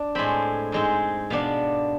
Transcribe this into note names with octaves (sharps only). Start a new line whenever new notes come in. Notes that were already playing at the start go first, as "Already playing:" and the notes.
Already playing: D4
A2 G#3 C4 B5
G#2 G#3 C4
B2 B3 D4 F5